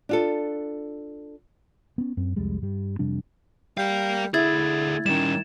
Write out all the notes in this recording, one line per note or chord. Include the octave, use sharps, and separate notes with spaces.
D4 F4 A4
B3 C#4
F#2 C4
C2 F2 G3 G#3
G2 G3
F2 C3 G3 D4
G3 A#4 F5
D2 D3 E4 G#4 G#6 A6
D#3 G3 C#4 E7